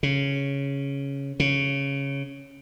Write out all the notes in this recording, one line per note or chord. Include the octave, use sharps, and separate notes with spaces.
C#3
C#3